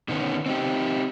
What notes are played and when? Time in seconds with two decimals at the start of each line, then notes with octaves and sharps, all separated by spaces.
0.08 B2 D3 D#3 B3 C#4
0.46 C4 D#4 G4